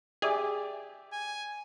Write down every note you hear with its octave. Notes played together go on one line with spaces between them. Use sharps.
G4 G#4 D5 E5
G#5